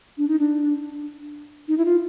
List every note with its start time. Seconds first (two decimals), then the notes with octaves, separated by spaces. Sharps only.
0.18 D4
0.28 D#4
0.39 D4
1.68 D#4
1.78 E4
1.85 F4